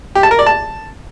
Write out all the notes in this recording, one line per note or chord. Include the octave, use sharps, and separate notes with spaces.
G4
A5
A#4
D5
A5